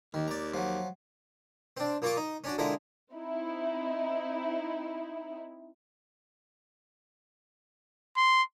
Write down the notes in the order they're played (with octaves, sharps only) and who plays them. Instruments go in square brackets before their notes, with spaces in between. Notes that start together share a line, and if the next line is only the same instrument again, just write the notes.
[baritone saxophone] D#2 [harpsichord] D#3
[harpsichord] D5 A#5
F3 F#3
C4 D4
A#2 A#3 F4 C#6 D6
D#4
C#4 D4 F#4
D3 F3 G#3 E4 A#4
[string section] C4 D#4 E4
[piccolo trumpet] C6